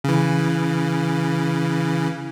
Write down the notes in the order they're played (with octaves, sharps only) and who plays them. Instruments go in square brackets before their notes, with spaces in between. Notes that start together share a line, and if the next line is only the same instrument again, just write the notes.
[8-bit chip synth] C#3 E3